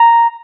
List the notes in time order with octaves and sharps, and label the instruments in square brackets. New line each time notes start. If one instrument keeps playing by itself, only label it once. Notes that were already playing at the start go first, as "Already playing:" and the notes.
Already playing: [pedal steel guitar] A#5